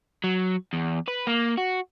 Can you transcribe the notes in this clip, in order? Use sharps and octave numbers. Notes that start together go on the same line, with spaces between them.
F#3
E2
B4
A#3
F#4